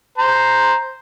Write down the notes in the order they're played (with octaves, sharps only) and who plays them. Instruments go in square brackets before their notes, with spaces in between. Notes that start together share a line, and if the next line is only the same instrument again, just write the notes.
[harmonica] C5 A#5